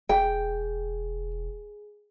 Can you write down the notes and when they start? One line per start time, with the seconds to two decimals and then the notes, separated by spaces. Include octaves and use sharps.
0.09 E1 G#4 G5